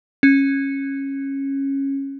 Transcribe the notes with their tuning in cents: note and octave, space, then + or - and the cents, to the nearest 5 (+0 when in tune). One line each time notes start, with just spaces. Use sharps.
C#4 -15